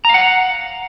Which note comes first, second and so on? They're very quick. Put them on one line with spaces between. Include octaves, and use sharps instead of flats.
A#5 F5 F#5